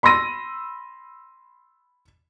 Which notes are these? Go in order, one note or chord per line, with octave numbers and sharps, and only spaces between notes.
B5 C6 E6 A#6 D#7